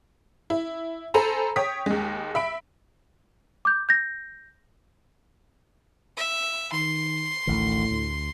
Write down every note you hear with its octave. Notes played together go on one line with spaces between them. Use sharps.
E4
A4 C5 G#5 A#5 B5
C#5 G5 D#6 B6
D#2 G#3
E5 B5 D7
D6 G6
G6 A#6
E5
D#3 C6
A1 D2 A2 D#3
D2